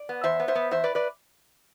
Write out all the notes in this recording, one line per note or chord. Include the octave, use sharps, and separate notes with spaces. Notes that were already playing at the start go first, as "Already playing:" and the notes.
Already playing: D5
B3
E2 C5 E5
B3
C5 E5
B3
E2 C5 E5
B4 D5
B4 D5